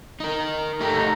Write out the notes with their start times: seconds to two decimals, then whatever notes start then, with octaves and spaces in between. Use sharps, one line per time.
0.20 D#4 A#4
0.81 A3 D#4 G4 A#5